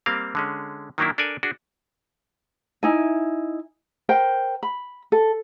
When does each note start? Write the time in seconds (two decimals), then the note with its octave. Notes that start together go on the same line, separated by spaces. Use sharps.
0.06 G3 A#3 C4 G4 F5
0.35 D3 G#3 C#4
0.98 D#3 F#3 A#3 D4 E4
1.18 D4 A4 A#4 D5 G#5
1.43 D4 F#4 G#4
2.83 D#4 E4 G#5
4.09 A#4 C5 G5
4.63 B5
5.12 A4